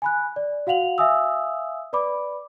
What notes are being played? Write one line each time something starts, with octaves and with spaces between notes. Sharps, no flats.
G#5 B5 F#6
D5
F#4 F5 F#5 F7 F#7
E5 F5 G#5 D#6 E6
B4 D5 B5 D6